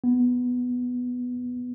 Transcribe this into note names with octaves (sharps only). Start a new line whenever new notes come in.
B3